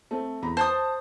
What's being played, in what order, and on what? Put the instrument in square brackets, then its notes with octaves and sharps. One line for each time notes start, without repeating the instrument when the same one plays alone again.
[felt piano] A3 C4
E2 A#5 B5
[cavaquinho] C5 D#6 [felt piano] A5